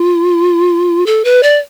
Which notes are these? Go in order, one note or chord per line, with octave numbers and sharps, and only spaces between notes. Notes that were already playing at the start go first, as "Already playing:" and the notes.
Already playing: F4
A4
B4
D5